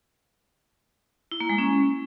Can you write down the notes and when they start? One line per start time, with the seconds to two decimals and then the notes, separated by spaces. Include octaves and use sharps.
1.31 E4
1.40 A#3
1.49 G#3
1.58 C#4